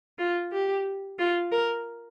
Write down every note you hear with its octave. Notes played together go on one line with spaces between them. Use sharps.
F4
G4
F4
A#4